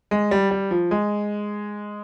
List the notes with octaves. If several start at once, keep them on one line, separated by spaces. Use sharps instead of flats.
G#3
G3
G3
F3
G#3